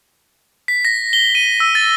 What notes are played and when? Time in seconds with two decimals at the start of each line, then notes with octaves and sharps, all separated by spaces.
0.68 B6
0.85 A#6
1.13 G7
1.35 D#7
1.60 E6
1.75 A6